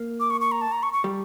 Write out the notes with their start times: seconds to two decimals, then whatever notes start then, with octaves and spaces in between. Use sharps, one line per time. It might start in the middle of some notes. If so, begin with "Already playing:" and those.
Already playing: A#3
0.20 D6
0.30 C#6
0.41 C#6
0.52 A#5
0.61 A5
0.72 A#5
0.83 C#6
0.93 C#6
1.04 G3